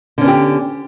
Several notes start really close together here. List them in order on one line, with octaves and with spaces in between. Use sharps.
D3 C#4 B3 G4